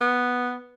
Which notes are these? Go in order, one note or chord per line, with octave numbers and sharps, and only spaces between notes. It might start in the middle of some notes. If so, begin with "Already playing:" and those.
B3